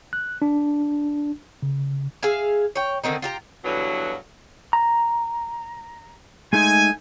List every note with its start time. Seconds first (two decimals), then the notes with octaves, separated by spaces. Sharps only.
0.13 F#6
0.42 D4
1.62 C#3
2.23 G#4 E5 F5 G#5
2.76 C#5 G5
3.04 D3 D#3 C4 D#4
3.22 F4 G4 A#5
3.64 G2 B2 D3 E3 F#3
4.73 A#5
6.53 G#3 A3 D#4 G#5